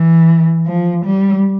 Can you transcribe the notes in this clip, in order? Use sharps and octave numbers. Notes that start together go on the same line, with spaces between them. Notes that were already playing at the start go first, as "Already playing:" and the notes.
Already playing: E3
F3
G3